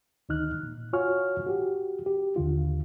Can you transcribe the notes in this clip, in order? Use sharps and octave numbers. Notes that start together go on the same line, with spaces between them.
D2 D#3 D#4 F6 F#6
A#2
F4 F#4 C#5 G#5 C#6 F6
F#4 G4
G4
D#2 D3 F4